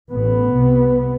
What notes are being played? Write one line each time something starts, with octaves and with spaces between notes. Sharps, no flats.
A1 A2 B3
C2 C3